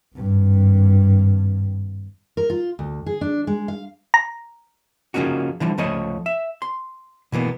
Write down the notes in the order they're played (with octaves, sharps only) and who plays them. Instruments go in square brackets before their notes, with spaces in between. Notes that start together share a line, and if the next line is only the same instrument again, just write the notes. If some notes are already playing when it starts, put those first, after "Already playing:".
[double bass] G#1 G2
[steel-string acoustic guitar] A#4
F4
D2
G#4
D4
G#3
F5
[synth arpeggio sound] A#5
[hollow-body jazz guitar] C#3 F3 A#3 C#4 D#4 F#4
D3 E3 F3 G3
C#2 C#3 F3 A3 C#5 D#5
E5
C6
B2 E3 A#3 B3